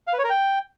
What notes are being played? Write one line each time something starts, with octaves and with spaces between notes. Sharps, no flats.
F5
B4
C#5
A#4
G5